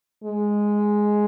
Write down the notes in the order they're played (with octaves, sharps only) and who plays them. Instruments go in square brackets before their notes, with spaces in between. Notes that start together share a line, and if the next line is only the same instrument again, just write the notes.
[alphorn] G#3